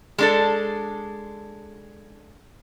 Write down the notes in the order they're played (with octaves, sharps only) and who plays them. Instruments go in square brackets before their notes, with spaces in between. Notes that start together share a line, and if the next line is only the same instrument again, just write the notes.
[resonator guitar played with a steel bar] G#3 D4 A4